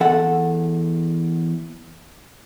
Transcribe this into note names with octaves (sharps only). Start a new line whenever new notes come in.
E2 A4 F#5